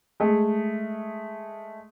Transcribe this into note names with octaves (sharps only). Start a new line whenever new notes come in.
G#3 A3